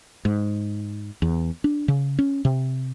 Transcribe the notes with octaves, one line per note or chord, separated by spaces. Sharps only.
G#2
E2
D4
C#3
C#4
C3